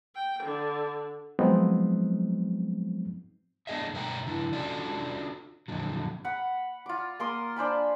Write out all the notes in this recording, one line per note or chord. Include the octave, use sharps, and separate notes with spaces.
G5
D3
F3 F#3 G#3 B3 C4 D#4
A3 B3 D4 G#4 D#5 E5
B2 A3 A#4 E5 G5 A#5
C#3 D4 E4
C#4 D4 F4 F#4 A4 D5
F2 A#2 D3 F#3
F#5 B5
F4 D6
A#3 A#4 C6 D#6
D4 C5 G#5 B5